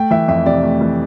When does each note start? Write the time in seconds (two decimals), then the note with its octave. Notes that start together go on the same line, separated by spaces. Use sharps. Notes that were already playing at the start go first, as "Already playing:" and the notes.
Already playing: A3 G5
0.11 E3 E5
0.28 F2 E5
0.46 C3 D5
0.63 A3
0.81 E3